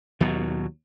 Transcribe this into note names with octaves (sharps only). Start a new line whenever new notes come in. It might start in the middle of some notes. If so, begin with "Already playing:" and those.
D#2 B2 F#3